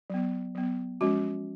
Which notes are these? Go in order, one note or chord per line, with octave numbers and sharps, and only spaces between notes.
F#3 B3
F#3 B3
F3 G#3 C#4 F#4